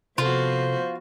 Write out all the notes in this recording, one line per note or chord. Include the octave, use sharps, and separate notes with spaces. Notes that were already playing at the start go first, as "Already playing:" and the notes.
C3 F3 B3 F4 F#4 A4 C5